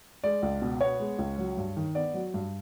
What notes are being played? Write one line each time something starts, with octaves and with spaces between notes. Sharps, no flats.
G#3 D5
C#2
B2
B3 C#5
G#3
C#2
F#3
G2
D#3
B3 D5
F#3
G2